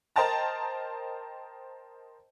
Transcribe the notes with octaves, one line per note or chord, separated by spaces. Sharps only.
A#4 C5 D#5 G5 A5 A#5